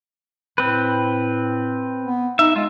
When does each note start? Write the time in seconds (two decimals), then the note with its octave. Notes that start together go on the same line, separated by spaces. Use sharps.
0.58 A2 C4 B4
2.04 B3
2.39 D#4 E5
2.56 G#3 F4